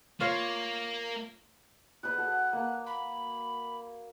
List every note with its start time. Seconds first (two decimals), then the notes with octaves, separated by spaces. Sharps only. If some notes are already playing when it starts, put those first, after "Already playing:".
0.20 A#3 F4 C#5 F5
2.03 B4 D5 D#6 F#6
2.18 F#4 A4
2.53 A#3
2.86 B5